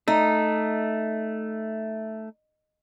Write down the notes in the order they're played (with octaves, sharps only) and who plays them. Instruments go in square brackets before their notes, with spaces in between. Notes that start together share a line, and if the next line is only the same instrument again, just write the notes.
[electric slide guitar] A3 [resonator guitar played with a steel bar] D#4